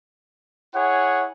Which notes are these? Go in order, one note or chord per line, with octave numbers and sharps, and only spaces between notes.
E4 G#4 C#5 F#5